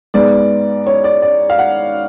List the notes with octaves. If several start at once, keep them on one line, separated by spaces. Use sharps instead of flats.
G#2 G#3 B3 D5
C#5
D5
D5
F5
F#5